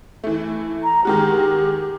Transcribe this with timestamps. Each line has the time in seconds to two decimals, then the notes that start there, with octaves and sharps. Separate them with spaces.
0.24 E3 A3
0.83 A#5
1.05 D#3 G#3 F#4 G4